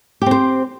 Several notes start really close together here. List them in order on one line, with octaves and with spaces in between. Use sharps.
G4 C4 C5